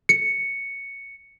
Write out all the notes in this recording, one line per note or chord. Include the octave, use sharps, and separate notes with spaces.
C#7